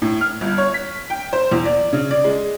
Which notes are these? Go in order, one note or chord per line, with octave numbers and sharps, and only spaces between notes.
A2
F6
G1
C#5
B6
G5
C5
E2
D5
C#3
D5
G#3